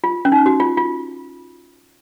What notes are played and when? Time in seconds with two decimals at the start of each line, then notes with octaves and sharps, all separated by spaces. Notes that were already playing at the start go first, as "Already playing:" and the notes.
0.04 F4
0.25 C#4
0.32 D#4
0.46 F#4
0.60 F4
0.77 F4